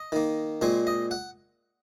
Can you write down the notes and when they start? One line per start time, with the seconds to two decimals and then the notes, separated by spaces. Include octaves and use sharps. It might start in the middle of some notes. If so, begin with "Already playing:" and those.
Already playing: D#5
0.12 D#3 A#3
0.61 A#2 G#3 C4 C#5
0.87 D#5
1.11 F#5